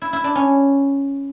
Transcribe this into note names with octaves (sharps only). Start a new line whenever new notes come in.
E4
E4
D4
C#4